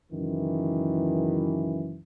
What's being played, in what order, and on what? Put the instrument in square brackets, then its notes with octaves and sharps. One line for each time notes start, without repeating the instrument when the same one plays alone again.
[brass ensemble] C#2 F#2 D#3 E3